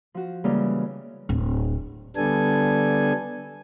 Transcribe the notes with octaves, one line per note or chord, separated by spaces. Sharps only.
F3 F#4
C#3 E3 G3 G#3 A#3
D1
D3 G3 B3 D4 A4 G#5